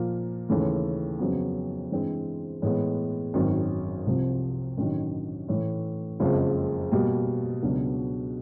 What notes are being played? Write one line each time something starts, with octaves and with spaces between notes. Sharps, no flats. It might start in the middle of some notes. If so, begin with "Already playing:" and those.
Already playing: A#2 F3 A#3
D#2 C#3 E3 A3
F2 C#3 F#3 B3
G2 E3 G#3 C4
A2 E3 G#3 B3
G#1 F#2 D#3
C2 C3 F3
A1 G2 D#3 F#3
A2 E3 A3
F#1 F2 C#3 F3 G#3
B2 G3 A#3
C#2 B2 F#3 B3 D4